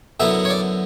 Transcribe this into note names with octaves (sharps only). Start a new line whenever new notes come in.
F#2 D3 F#3 B3 E4 E5
C#5
D5